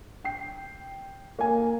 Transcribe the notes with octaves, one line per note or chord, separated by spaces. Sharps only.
G5 C7
A#3 G#5